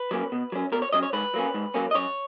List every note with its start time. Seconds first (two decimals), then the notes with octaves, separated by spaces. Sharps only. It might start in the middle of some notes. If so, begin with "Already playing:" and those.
Already playing: B4
0.11 F#3 A#3 C#4
0.32 B2
0.52 F#3 C#4
0.72 B2 A#4
0.82 C#5
0.93 F#3 C#4 D#5
1.03 C#5
1.13 G#2 B4
1.34 F#3 A#3 C#4
1.54 G#2
1.74 F#3 A#3 C#4
1.91 D#5
1.95 F#2 C#5